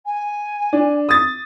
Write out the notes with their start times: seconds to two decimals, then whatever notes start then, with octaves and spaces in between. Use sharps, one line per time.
0.05 G#5
0.73 D4
1.09 D#6 A6